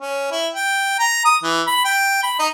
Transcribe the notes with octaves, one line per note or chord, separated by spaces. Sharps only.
C#4
E4
G5
A#5
D#6
E3
B5
G5
B5
D#4